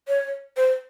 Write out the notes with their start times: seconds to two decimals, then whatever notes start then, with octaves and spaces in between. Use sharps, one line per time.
0.08 C#5
0.57 C5